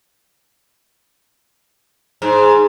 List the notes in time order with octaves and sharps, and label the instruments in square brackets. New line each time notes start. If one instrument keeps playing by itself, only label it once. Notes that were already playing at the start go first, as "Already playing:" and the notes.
[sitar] G#2